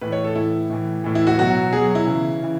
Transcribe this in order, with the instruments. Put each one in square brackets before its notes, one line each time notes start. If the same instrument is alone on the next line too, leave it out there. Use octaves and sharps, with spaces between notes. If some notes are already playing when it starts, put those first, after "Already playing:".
[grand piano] A2 E3 B4
C#5
A4
A2 E3 E4
A2 E3
A2 E3
E4
F#4
B2 F#3 F#4
B2 F#3 G#4
E4
C#3 E3
C#3 E3